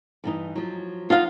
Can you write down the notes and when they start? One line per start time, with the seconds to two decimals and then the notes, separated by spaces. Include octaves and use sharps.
0.24 G2 E3 D#4
0.55 F3 F#3
1.10 D#4 F4 F5 F#5